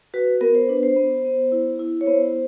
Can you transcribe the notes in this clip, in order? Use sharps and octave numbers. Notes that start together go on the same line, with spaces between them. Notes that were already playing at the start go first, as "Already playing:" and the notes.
F#4 B4
B3 A#4
C5
D4 B4
C5
B3
B3
E4
E4
C#5
B3 C5